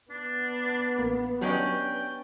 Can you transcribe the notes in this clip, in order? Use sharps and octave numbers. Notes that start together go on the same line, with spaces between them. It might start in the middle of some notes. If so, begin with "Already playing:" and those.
B3 D4
A1 A#3
F#3 C#4 D4 G4 C#5 D#5 G5